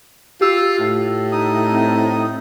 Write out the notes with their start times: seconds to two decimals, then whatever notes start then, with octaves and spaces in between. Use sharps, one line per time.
0.41 F4 G4 E6
0.79 A2
1.32 D#4 D#6
1.71 C4